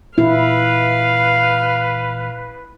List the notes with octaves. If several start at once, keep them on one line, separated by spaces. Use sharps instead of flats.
A#2 E3 E4 B4 F5